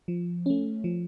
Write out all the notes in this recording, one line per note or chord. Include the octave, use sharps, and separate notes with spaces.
F3
A3 C#4
F3